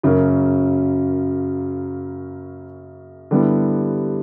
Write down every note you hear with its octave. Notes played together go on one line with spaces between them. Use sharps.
F#2 C#3 F#3 A#3
D3 G3 B3 E4